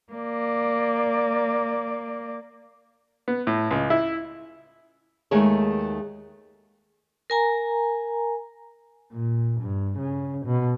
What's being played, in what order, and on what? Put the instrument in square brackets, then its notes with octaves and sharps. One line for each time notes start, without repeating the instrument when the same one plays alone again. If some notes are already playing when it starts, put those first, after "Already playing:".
[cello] A#3 D5
[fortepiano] B3
A2
C#2
E4
[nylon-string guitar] D#2 D#3 G#3 A3 C#5
[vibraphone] A#4 G#5 A#5
[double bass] A#2
G2
C#3
B2